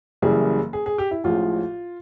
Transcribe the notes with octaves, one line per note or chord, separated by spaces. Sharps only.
F#1 F#2 C#3 E3 G3 G#4
G#4
G#4
G4
E4
A1 A2 F3 G#3 F4